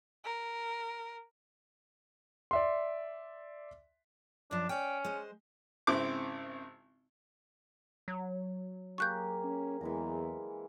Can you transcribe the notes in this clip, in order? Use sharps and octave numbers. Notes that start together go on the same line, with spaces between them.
A#4
D5 E5 C6
F#2 F3 D4
C#4 D5 G5
G#3 C5
G#1 C#3 C4 E4 D6
F#3
A#3 G4 G#4 C#6 F#6 G6
C#4
E2 E3 G#3 A#5